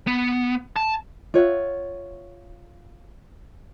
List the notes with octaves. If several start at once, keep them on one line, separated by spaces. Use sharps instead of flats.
B3
A5
F4 C#5 E5 F#5